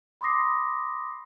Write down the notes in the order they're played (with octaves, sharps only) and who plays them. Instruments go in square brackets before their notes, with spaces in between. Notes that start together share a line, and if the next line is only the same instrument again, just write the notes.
[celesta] B5 C6 D6 D#6 A#6 C7